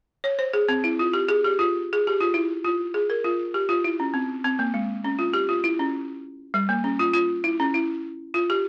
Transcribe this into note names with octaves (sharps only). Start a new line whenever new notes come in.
C#5
C5
G#4
C4
E4
F4
G4
G#4
G4
F4
G#4
G4
F4
E4
F4
G#4
A#4
F4
G4
F4
E4
C#4
C4
C4
A#3
G#3
C#4
F4
G4
F4
E4
C#4
G3
A#3
C#4
F4
F4
E4
C#4
E4
F4
G4